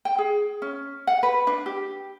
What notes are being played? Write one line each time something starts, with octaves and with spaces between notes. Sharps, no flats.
G5
G#4
C#4
F#5
B4
D4
G4